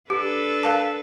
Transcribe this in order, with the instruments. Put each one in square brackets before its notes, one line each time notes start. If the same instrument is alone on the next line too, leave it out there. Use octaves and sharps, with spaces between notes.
[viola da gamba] D4 A4 B4 [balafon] G4
[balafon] A#4 F5 A5